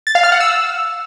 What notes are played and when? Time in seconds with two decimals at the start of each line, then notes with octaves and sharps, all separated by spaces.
0.07 A6
0.15 F5
0.24 F6
0.32 F#5
0.40 E6